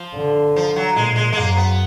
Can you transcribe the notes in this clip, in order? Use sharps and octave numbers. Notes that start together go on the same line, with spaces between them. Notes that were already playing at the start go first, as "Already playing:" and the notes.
Already playing: F3
D3
F3
F#3
A#2 G#3
G#3
G#3
F#2 A#3
B3